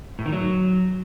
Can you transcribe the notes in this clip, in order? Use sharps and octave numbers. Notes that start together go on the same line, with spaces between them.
A2
D#3
F#3